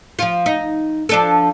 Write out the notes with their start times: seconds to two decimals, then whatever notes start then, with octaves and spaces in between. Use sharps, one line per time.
0.19 F3 F4
0.46 D#4
1.09 F3 D4 A4